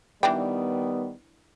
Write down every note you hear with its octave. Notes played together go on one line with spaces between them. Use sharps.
D#3 E3 G3 B3 D4 G5